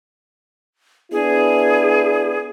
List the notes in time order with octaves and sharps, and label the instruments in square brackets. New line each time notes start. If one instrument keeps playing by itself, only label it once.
[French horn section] B3 D4 E4 [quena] G#4